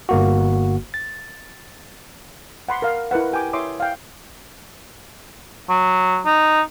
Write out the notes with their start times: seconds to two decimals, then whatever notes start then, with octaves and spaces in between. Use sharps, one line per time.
0.09 G1 A#3 F#4
0.94 A6
2.69 F#5 B5 C6 D6
2.82 A#4 F5
3.11 E4 A#4 B4 F#5
3.32 G4 G5 G#5 D6
3.53 E4 C#5 E5 C6 D6 D#6
3.80 F5 G5
5.70 F#3
6.26 D#4